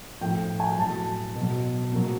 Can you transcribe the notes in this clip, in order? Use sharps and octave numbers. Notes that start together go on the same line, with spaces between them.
A2 F3 G5
G#5
A2 F#3 A5
B2
F#3
A#2 F#3